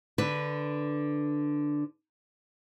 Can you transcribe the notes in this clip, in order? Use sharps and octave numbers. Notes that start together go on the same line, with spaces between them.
D3 B4